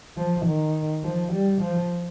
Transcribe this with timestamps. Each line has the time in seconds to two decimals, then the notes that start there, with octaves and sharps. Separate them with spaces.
0.17 F3
0.45 D#3
1.04 F3
1.32 G3
1.61 F3